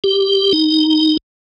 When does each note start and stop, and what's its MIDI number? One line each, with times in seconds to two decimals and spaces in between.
0.04 0.53 67
0.53 1.17 63